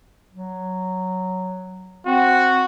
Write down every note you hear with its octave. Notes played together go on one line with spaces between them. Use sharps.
F#3
C4 F#4